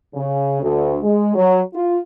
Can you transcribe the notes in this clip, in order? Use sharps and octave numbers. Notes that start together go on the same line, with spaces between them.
C#3
D2
G#3
F#3
F4